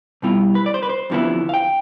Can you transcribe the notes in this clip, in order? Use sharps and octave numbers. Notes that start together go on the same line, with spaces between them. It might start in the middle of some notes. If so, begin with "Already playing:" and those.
B2 G3 B3 E4 F4
B4
D5
C5
B4
C5
F2 D3 F3 B3 E4
F5
G5